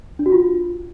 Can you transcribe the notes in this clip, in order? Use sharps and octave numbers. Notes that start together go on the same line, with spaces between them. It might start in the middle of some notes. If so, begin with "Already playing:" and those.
D4
F#4
F4